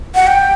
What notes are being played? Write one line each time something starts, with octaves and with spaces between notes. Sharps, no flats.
F#5
G5